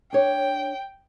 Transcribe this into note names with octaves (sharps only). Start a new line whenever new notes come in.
D4 C#5 G5